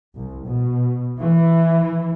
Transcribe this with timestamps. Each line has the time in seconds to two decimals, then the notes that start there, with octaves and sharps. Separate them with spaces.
0.15 C2
0.48 B2
1.20 E3